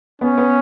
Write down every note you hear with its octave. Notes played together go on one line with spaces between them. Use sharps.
B3 C#4
B3